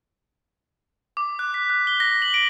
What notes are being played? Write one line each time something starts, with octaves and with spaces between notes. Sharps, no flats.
D6
F#6
B6
F#6
G7
A#6
F#7
D7